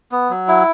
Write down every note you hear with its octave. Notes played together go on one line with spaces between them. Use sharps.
B3
F#3
E4